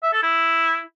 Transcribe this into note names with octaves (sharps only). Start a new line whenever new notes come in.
E5
A4
E4